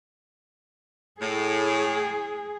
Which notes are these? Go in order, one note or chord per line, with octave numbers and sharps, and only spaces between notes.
A2 G#4